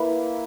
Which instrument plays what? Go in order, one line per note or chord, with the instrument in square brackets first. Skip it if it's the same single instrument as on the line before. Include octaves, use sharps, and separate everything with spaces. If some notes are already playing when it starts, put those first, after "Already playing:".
Already playing: [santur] A#3 E4 B4